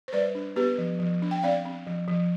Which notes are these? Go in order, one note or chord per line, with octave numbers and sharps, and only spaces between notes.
C5
G3 B4 D5
D4
B3 G4 B4
F3
F3
D4
G5
C4 D5 F5
C4
F3
F3